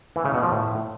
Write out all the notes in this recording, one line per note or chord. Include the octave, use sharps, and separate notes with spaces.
E3
C#3
B2
F3
A2